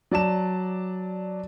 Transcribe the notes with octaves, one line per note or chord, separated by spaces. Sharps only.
F#3 D5 A5 E7